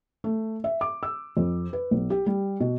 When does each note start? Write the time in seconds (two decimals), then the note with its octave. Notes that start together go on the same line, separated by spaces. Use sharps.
0.24 A3
0.64 E5
0.81 D6
1.03 E6
1.37 F2
1.73 B4
1.91 B1
2.10 G4
2.26 G3
2.60 B2